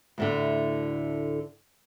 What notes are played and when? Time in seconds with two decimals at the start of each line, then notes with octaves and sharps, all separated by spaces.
0.18 D2 A2 D3